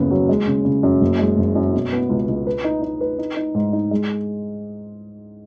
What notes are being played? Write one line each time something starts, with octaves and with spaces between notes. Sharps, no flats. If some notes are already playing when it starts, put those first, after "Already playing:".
Already playing: F#1 D#2 C#3 B3
F#3
G#3
C#3
C#3
F#2
F#1
G#3
F#1
F#2
B2
B3
C#2
C#2
B4
D#4
D#4
B4
D#4
D#4
G#2
D#4
G#3